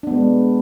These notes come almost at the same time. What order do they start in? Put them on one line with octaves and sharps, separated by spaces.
D4 B3 G#3